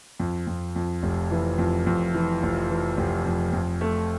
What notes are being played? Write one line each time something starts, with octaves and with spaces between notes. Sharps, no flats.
F2
F2
F2
F1
E3
F2
F2
E3
F1
E3
F1
F2
F2
A3